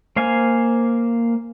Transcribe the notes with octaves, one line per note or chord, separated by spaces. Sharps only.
A#3 C5 F5 G#5